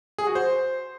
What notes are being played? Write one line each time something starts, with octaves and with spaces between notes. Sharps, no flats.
G#4
F#4
C5